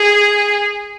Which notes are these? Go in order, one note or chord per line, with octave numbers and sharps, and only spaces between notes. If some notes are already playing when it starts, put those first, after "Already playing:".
Already playing: G#4